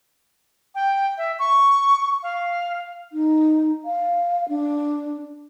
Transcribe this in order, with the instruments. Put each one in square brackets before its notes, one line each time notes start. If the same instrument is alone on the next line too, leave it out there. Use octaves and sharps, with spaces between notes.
[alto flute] G5
E5
C#6
F5
D#4
F5
D4